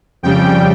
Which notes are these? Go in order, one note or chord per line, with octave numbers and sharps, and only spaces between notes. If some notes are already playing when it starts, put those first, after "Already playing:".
F2 C#3 G3 G5